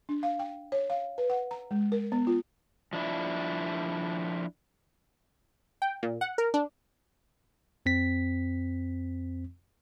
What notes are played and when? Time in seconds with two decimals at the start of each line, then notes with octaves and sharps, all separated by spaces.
0.09 D4
0.23 F5
0.39 G5
0.72 C#5
0.90 F5
1.18 B4
1.30 F#5
1.51 A#5
1.71 G#3
1.92 A#4
2.12 B3
2.27 F4
2.93 F3 D4 E4
5.82 G5
6.03 A#2
6.21 F#5
6.38 A#4
6.54 D4
7.86 F2 C4 B6